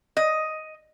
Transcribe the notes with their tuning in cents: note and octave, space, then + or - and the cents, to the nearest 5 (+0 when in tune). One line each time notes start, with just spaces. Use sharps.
D#5 +5